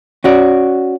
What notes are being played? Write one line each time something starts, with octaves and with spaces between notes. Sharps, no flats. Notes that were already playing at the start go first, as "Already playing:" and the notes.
C#4 F#4 D5